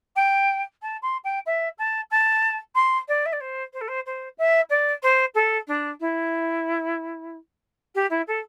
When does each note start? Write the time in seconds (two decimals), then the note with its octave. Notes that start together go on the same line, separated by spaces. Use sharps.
0.15 G5
0.81 A5
1.02 C6
1.24 G5
1.46 E5
1.78 A5
2.10 A5
2.75 C6
3.08 D5
3.25 E5
3.32 D5
3.40 C5
3.73 C5
3.80 A4
3.87 C5
4.05 C5
4.38 E5
4.69 D5
5.02 C5
5.34 A4
5.67 D4
6.00 E4
7.94 G4
8.10 E4
8.27 A4